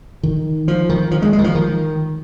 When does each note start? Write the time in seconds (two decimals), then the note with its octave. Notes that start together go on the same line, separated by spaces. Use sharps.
0.23 D#3
0.68 F3
0.89 D#3
1.11 F3
1.22 G#3
1.33 G#3
1.39 D#3
1.44 F3
1.55 D#3